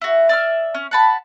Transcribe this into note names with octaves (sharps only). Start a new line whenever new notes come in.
E4 F#4
D5 E5 F6
C#4
F#5 A5 B5